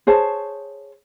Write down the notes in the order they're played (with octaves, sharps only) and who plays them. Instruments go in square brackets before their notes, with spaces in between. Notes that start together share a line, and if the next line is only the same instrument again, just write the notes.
[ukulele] G#4 C5 C#5 A5